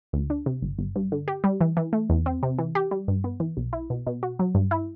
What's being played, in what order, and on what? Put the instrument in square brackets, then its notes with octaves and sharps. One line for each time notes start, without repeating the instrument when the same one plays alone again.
[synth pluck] D2
D4
C3
G1
G1
G2
D3
G4
G3
E3
E3
A3
E2
C4
C3
E3
G4
G3
G2
B3
E3
B1
E4
B2
B2
F#4
F#3
G2
E4